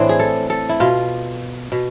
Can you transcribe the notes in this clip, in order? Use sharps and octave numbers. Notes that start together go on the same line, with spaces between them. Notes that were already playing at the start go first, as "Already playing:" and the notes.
Already playing: A2 E3 C4 D4 E4
G#4
A4
A4
E4
B2 F4
B2